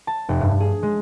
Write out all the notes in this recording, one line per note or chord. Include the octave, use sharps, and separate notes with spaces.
A5
F1
G2
G#4
G#3